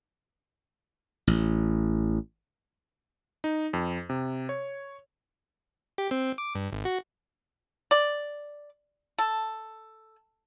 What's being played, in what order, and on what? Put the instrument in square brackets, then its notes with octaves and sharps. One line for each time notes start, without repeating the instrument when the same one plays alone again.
[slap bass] A1
[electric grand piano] D#4
F2
C3
C#5
[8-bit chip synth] G4
C4
D6
G2
G#1
F#4
[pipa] D5
A4